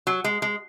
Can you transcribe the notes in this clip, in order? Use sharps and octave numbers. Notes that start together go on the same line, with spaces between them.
F#3
G#3
G#3